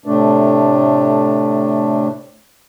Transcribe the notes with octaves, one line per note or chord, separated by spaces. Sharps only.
A2 C3 A3 D4